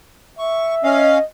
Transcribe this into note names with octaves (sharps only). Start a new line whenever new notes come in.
E5 C#6
C#4 D#5 F5